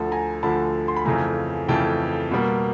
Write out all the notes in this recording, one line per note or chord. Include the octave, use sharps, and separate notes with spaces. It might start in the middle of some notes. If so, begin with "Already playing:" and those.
Already playing: D2 D3 F3 A5
G#5 A#5
D2 D3 F3 A5 B5
C6
B5
F2 C#3 E3 A3 G#5 A#5
F2 C#3 E3 A3 G5 A5
B2 G3 A#3